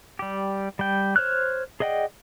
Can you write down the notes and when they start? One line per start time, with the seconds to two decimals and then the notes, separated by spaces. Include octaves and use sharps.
0.19 G3 G4
0.79 G3 G5
1.16 C5 C#5 F6 F#6
1.80 G#4 D5 D#5 F#5 G5